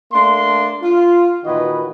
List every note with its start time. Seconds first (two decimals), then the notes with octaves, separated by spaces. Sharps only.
0.12 A3 A#3 D4 C6
0.82 F4
1.44 A#2 D#3 E3 F#4 B4 D#5